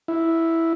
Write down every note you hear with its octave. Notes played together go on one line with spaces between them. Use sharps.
E4